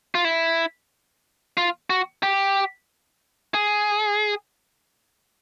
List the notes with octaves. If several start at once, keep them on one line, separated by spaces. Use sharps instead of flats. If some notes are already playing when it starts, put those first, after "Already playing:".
F4
E4
F4
F#4
G4
G#4